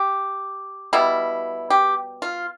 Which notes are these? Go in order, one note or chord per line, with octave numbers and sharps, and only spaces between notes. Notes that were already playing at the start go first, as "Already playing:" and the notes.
Already playing: G4
B2 G3 B3 E4
G4
F4